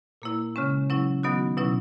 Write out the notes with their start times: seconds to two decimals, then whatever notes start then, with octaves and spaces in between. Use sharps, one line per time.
0.22 A#2 A#3 E4
0.56 C#3 G#3 C#4
0.90 F#3 C#4 E4
1.23 D#3 F#3 B3 D#4 F#4
1.57 B2 F#3 C#4 E4